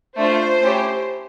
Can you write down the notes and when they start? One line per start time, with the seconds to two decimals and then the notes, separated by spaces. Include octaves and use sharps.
0.17 A3 D4 F4 A4 C5
0.61 A3 C#4 E4 G4